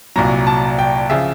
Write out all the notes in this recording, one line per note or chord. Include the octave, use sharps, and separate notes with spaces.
C2 A#2 F#3 A#5
A5
G5
C#3 F3 E5